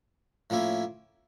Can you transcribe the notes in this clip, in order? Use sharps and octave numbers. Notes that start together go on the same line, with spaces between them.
A2 F3 A#3 C#4 E4